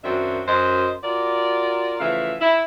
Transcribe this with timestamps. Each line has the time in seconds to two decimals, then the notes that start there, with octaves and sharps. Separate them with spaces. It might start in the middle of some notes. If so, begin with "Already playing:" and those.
0.04 F#2 D#3 C4 D4 F#4 E5
0.47 F#2 C5 D#5
1.04 F4 F#4 A#4 D5
2.00 C#3 E3 F3 A3 E5 F5
2.41 E4